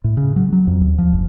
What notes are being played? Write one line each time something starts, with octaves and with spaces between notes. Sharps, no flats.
A2
C#3
F#3
F#3
F2
D#2
F3
F#1